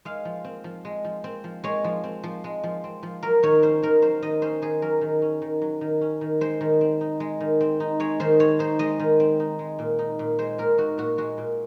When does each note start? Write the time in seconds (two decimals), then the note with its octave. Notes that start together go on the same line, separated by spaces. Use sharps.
0.05 G#3 F5
0.25 F3
0.44 C4
0.64 F3
0.85 G#3
1.04 F3
1.24 C4
1.44 F3
1.64 G#3 C#5
1.84 F3
2.04 C4
2.23 F3
2.44 G#3
2.63 F3
2.84 C4
3.03 F3
3.23 F#3 A#4
3.43 D#3 C#5
3.62 C#4 C5
3.83 D#3 A#4
4.02 F#3 C5
4.22 D#3 D#5
4.42 C#4 C5
4.62 D#3 G#4
4.82 F#3 A#4
5.01 D#3
5.22 C#4
5.42 D#3
5.62 F#3
5.81 D#3
6.01 C#4
6.21 D#3
6.41 G#3 C5
6.61 D#3
6.81 C4
7.01 D#4
7.20 G#3
7.40 D#3
7.61 C4
7.80 D#4
8.00 G#3 C#5
8.20 D#3 C5
8.40 C4 C#5
8.59 D#4 C5
8.79 G#3 D#5
9.00 D#3
9.20 C4
9.40 D#4
9.59 G#3
9.79 A#2
9.99 D#4
10.19 A#2
10.39 G#3 C5
10.58 A#2 A#4
10.78 D#4 F#4
10.98 A#2 F#4
11.18 G#3 F#4
11.38 A#2